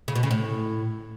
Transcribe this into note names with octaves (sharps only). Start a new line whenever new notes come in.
C#3
B2
C#3
A2